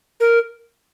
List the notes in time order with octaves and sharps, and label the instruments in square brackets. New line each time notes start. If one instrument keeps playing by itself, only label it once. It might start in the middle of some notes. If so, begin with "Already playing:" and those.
[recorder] A#4